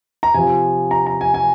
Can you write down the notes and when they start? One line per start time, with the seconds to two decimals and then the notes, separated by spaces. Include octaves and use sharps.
0.23 A#5
0.34 C3 F3 G#5
0.91 A#5
1.06 A#5
1.21 G#5
1.34 G#5